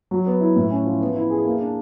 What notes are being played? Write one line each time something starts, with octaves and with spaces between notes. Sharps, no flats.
F#3
B3
E4
A2
C#4
F3
B3
E4
G#4
A#3
D4